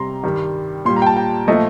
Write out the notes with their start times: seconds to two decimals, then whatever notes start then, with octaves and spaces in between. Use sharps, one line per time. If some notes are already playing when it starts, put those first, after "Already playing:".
Already playing: C3 G3 A#5 C6
0.24 G2 D#3 G3
0.85 A#2 G3 C6
0.96 A#5
1.02 G5
1.06 A5
1.16 G5
1.48 A#2 F3 A3 D#5